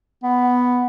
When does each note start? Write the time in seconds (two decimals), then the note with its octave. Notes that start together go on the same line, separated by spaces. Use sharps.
0.23 B3